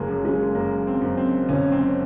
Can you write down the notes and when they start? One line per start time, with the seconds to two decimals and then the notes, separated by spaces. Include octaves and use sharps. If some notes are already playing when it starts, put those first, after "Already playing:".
Already playing: F#1 G#3 A#3
0.08 F#2
0.25 G#3
0.55 F#2 A#3
0.87 C4
1.02 F#2
1.18 C4
1.49 F#1 C#4
1.72 C4